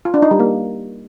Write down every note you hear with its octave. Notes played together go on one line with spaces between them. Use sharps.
F4
D4
D#4
G3
A#3